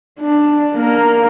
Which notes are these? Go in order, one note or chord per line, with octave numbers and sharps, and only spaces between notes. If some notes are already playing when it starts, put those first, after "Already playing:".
D4
A#3 A#4